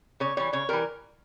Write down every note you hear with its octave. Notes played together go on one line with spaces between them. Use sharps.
C#3 C#5
E3 G3 C#5
C#3 C#5
E3 G3 A#4